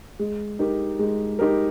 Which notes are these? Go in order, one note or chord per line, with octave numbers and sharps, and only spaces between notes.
G#3
D#4 G4 A#4
G#3
D#4 G4 A#4